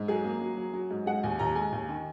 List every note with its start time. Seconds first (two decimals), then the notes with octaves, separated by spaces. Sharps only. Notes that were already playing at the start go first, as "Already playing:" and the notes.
Already playing: G#2
0.08 F#3 G#4
0.25 A#3
0.41 F#3
0.57 F#3
0.73 F#3
0.91 G#2
1.06 G#3 F#5
1.23 D#2 G#5
1.39 D#2 A#5
1.55 G#3 G#5
1.72 D#2
1.89 D#3